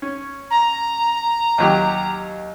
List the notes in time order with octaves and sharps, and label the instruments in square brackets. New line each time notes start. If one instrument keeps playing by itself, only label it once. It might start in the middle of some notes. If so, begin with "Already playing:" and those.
[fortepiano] C#4
[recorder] A#5
[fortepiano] D#2 F#3 G4